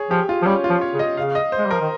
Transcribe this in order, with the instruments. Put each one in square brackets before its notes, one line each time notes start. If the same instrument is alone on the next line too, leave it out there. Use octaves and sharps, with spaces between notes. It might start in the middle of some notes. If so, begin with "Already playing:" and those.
Already playing: [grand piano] G#4 C#5
[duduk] F3 [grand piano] G4
[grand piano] F4
[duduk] F3
[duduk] G3 [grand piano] C#4
[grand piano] F4
[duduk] F3
[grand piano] C#5
[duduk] C#3
[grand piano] D#5
[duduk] C#3 [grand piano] F5
[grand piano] D#5
C5
[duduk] G#3
G3
[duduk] F3 [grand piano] A#4
[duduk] D#3